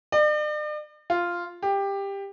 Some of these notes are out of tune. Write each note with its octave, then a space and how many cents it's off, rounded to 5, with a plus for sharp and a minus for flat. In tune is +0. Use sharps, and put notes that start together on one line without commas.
D5 +45
F4 -5
G4 +15